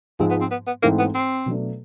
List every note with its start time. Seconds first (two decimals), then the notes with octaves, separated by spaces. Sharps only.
0.20 G#2 F3 G#3 C4
0.30 B3
0.41 C4
0.51 B3
0.67 B3
0.82 G#2 E3 A3 A#3 C4 D#4
0.99 B3
1.14 C4
1.46 B2 F#3 A3 D4